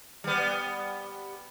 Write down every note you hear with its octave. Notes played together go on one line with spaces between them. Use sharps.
G3 B3